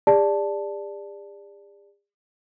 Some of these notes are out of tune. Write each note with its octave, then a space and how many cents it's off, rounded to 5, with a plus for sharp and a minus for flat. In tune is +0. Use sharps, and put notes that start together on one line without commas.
G#4 -45 D5 +0 A5 +0